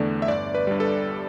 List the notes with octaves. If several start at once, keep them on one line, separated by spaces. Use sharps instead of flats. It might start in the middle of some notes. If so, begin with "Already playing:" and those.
Already playing: E2 D3 A3 D5
E5
G1 D5
B4
G2 G3
A4